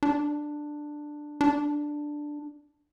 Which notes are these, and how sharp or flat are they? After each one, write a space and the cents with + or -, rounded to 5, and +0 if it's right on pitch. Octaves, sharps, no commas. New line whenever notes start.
D4 +10
D4 +5